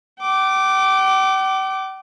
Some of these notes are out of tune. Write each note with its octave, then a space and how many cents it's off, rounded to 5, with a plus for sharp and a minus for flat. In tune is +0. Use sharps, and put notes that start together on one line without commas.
G5 -45 D6 +0